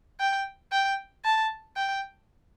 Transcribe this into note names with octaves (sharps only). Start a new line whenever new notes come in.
G5
G5
A5
G5